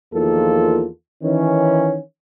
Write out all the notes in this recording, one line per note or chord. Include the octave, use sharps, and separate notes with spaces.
E2 D#3 F3 A#3 F4 A4
D#3 E3 C#4